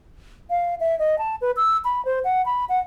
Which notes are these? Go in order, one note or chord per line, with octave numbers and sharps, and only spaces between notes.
F5
E5
D#5
A5
B4
E6
B5
C5
F#5
B5
F#5